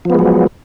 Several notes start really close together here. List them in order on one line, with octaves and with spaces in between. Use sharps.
F3 B3 G#3 F#3